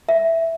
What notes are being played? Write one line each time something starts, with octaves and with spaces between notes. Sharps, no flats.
E5